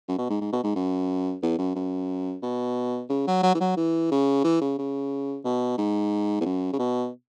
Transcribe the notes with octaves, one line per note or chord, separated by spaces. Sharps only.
F#2
B2
G#2
G#2
B2
G#2
F#2
E2
F#2
F#2
B2
C#3
F#3
F#3
E3
F#3
E3
C#3
E3
C#3
C#3
B2
G#2
E2
F#2
C#3
B2